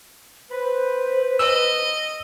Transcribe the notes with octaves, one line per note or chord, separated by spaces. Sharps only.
B4 C5
D#5 E6